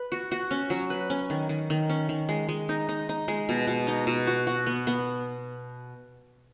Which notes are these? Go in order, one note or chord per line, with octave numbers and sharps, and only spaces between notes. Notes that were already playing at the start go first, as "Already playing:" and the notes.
Already playing: B4
F#4
F#4
C#4
F#3
B4
C#4
D#3
D#3
D#3
C#4
D#3
G#3
G#3
D#4
D#4
D#4
G#3
B2
B2
D#4
B2
F#4
F#4
B3
B3